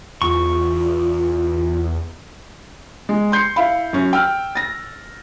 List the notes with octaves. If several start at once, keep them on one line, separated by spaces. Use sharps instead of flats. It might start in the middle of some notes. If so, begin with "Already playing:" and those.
E2 F4 C#6
G#3
C6 G6 C7 C#7
E4 F5 B5
F#2 C#4
G5 E6 F6
A6 A#6